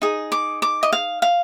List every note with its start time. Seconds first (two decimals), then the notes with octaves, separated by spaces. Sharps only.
0.02 D#4 G#4
0.32 D6
0.62 D6
0.83 D#5
0.93 F5
1.22 F5